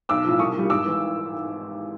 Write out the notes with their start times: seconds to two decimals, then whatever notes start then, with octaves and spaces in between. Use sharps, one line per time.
0.09 B1 D6 E6
0.25 A2 F3
0.39 C2 C#6 D#6
0.55 A#2 G3
0.70 G#1 D6 E6
0.85 G#2 E3